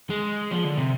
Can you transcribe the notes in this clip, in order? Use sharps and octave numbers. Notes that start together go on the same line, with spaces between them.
G#3
F3
D3
C3